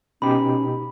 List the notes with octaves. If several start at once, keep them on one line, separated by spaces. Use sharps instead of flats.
B2 C#4 D#4 G4 B5